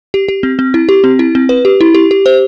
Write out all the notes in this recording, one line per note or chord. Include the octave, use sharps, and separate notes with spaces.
G4
G4
C4
C4
E4
G4
C4
E4
C4
B4
G4
E4
G4
G4
C5